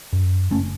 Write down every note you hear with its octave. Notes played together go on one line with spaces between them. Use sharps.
F#2
F#1 A3 C#4